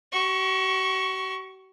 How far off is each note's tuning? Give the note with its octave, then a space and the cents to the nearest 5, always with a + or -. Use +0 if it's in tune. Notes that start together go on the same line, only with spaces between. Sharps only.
F#4 +45 C#6 +0